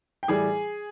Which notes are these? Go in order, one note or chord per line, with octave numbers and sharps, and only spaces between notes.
G5
A2 E3 G3 G#4 G#5